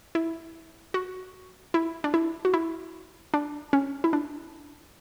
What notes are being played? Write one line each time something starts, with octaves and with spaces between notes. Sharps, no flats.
E4
F#4
E4
D4
E4
F#4
E4
D4
C#4
E4
D4